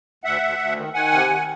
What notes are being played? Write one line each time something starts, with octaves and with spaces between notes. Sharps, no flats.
D2 E5 F#5
D2
D2
D#3
D#3 F#5 G#5
C3
D#3